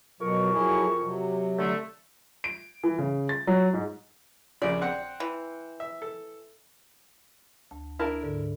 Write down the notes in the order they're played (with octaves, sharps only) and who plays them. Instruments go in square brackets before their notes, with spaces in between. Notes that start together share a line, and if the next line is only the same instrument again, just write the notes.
[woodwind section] F2 A#4 C#6 [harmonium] B2 F#3
[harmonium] F#3 E4 G#4
C3 F#3
[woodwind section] D3 A3
[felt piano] D7
E3
C#3
A6
F#3
G#2
[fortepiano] A#1 C#3 [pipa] D5
[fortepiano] C4 F#5
[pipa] E3
[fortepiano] E5
A4
[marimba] D2 A5
[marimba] D4 [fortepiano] E4 A#4 A5
[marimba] G#2 D3 A4